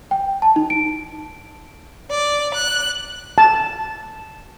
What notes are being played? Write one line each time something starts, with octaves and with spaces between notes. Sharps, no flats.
G5
A5
D#4
D7
D5
F#6
A5